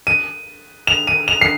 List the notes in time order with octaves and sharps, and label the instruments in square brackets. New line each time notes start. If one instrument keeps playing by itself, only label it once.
[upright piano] D#7
F7
D#7
F7
C7